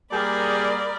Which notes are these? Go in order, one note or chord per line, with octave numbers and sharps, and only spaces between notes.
G3 A#3 G#4 A#4 D5 B5